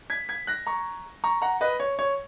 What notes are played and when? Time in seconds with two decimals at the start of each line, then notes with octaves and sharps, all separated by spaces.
0.10 G#6 B6
0.29 G#6 B6
0.47 F#6 A#6
0.67 A#5 C#6
1.24 A#5 C#6
1.42 F#5 A#5
1.61 B4 D#5
1.80 C#5
1.99 C#5